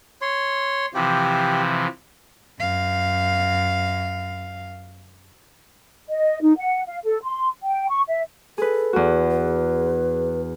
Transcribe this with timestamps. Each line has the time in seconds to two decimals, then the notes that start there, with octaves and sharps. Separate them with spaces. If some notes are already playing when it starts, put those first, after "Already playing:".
0.21 C#5 C6
0.94 C3 E3 F3 G4
2.60 F#2 F5
6.08 D#5
6.42 D#4
6.57 F#5
6.88 F5
7.03 A4
7.24 C6
7.63 G5
7.90 C#6
8.09 E5
8.58 G#4 A4 B4
8.93 E2 F#4
9.31 B4